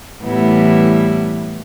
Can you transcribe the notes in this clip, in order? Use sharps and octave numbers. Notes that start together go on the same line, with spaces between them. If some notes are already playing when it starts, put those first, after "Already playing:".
A2 E3 G3 B3 E4